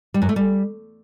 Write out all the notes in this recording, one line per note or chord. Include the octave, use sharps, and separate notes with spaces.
G3
F#2
A3
G3